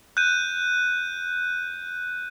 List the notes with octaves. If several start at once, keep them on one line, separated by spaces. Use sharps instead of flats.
F#6 G6 D#7